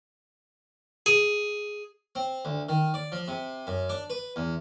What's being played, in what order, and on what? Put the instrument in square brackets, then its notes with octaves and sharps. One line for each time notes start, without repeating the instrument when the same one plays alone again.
[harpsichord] G#4
C4
D2
D#3
D5
F3
C3
F#2
D4
B4
E2